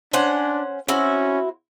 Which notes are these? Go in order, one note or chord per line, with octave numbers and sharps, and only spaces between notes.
C#4 D4 C5 F#5
C4 C#4 E4 F#4